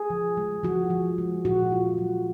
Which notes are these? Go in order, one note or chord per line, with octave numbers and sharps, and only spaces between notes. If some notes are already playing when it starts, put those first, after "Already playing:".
Already playing: G#4
F3
G#3
F3 F#4
F3
G#3
A#2 F#4
F4
F#3